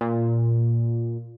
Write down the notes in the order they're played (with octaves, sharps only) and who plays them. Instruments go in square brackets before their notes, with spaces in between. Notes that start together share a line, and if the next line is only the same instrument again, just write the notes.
[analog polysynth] A#2